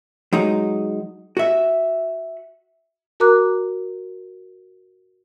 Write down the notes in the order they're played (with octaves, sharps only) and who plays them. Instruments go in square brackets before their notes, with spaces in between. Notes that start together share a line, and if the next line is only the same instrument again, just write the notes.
[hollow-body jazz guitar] F#3 G#3 D#4
F#4 E5
[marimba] F#4 A#4 A#5 D6 F#6